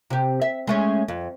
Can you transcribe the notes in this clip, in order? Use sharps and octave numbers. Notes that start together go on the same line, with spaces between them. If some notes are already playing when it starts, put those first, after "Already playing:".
C3 G4
E5
G#3 A3 C#4
F2